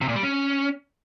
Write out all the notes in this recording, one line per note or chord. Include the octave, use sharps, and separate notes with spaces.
C3
A#2
G3
C#4